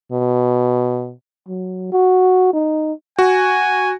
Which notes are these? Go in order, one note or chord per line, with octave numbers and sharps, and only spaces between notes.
B2
F#3
F#4
D#4
F#4 G#5